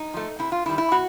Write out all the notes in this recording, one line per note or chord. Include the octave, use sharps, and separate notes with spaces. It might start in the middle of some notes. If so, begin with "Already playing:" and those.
Already playing: D#4
F3 A3
C3 E4
F4
D#3 G3 E4
E4
B2 F#4